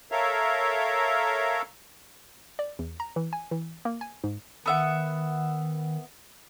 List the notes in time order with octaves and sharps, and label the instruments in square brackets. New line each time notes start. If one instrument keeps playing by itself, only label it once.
[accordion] A4 A#4 C#5 E5 F5 A#5
[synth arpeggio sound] D5
E2
A#5
E3
G#5
E3
A#3
G#5
G#2
[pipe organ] D#3 [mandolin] B3 E5 F#5